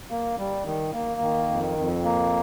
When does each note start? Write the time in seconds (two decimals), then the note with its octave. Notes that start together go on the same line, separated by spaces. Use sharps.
0.11 A#3
0.38 G3
0.66 D#3
0.93 A#3
1.21 D#3
1.49 F2
1.78 F2
2.04 A#3